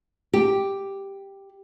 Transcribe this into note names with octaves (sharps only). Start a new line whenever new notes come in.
G4